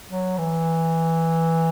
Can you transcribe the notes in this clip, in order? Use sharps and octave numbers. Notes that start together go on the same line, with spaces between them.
F#3
E3